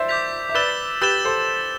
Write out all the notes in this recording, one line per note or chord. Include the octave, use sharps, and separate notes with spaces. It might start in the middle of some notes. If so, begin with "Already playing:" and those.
Already playing: C5 D5 E5
D6 G6 B6 F7
E5
B4 D5 E6 A6 E7 G7
G4 B4 E6 A6 E7 G7
A4 C5